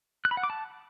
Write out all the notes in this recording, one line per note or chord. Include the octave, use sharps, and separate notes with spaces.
F#6
B5
F#5
D6
A5